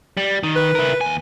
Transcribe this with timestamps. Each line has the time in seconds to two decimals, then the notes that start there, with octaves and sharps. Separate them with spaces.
0.17 G3
0.43 D#3
0.56 B4
0.75 E4 A#4
1.01 D#2 G#5